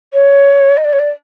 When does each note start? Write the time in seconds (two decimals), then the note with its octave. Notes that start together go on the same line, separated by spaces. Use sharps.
0.13 C#5
0.77 D#5
0.85 D5
0.93 C#5
0.99 D5